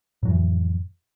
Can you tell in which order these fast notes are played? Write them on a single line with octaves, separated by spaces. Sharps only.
A2 F#3 F2 E3